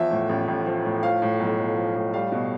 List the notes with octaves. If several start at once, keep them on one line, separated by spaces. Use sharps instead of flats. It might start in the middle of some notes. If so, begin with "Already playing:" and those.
Already playing: E2 F3 E5
A2
A1
A1
F3
A2
F3 F5
A2
B1
B1
F3
A2
G3 F5
B2